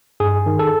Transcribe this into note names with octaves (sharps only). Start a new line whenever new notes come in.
G2 G#4
D#3
A4